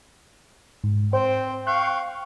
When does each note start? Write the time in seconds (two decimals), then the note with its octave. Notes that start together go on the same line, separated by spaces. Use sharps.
0.84 G#2
1.13 C4 C5 G5
1.67 F5 G5 C#6 F#6